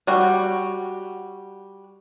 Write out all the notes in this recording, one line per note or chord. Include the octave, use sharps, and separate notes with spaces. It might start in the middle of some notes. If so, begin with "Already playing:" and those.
G3 F#4